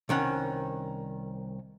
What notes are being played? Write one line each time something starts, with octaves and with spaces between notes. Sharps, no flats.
C2 D#3 C#4 F#5